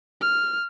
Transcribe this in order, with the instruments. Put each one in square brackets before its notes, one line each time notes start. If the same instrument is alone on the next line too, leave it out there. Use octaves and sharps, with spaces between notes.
[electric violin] F6